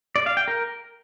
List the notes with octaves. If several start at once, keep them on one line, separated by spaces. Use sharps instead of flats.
D5
F5
G5
A#4